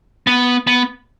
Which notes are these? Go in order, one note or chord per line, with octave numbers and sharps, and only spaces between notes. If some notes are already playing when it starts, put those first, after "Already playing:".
B3
B3